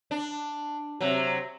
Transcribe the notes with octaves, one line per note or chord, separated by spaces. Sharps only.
D4
C3 F#3